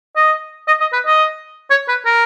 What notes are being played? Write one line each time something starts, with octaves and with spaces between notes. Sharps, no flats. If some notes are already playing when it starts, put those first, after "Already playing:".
D#5
D#5
D#5
B4
D#5
C#5
B4
A#4